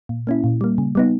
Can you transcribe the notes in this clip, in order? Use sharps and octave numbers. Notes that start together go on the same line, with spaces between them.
A#2
A#3 C#4 E4
A#2
G3 A#3
C#3
G3 B3 D#4